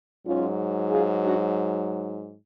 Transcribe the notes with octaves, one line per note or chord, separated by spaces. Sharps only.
G#2 F#3 C#4 F4
F4 G#4
D4 F#4